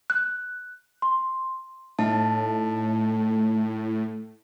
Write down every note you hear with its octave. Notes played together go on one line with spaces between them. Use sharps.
F#6
C6
A2 D#4 A5